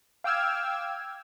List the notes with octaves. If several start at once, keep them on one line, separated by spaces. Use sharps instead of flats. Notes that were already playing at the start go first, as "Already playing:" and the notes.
F5 G5 D6 E6 F6 G#6